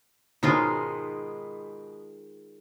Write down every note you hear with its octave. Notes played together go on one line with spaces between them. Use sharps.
G#2 B2 D#3 G#3 C#4 F4